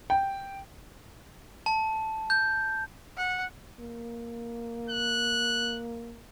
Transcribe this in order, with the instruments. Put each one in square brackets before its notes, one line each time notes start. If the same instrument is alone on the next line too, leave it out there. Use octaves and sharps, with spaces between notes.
[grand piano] G5
[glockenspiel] A5
G6
[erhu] F#5
[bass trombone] A#3
[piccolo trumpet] F#6